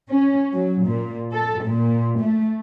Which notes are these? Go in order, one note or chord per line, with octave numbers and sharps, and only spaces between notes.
C#4
F#3
A#2
A4
A#2
A3